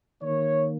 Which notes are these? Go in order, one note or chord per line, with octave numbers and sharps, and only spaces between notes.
D#3 A#3 C#5